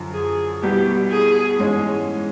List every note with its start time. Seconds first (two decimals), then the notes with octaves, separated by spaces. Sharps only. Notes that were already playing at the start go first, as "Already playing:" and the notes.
Already playing: F#2 D3 F3
0.14 G#4
0.62 C2 B2 G3 B3 E4 G4
1.10 G#4
1.59 G#2 E3 G#3 C#4